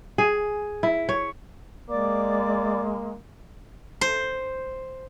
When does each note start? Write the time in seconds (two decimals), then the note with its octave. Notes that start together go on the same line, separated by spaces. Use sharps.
0.18 G#4
0.83 E4
1.09 C#5
1.90 G#3 A#3 D5 D6
4.01 C5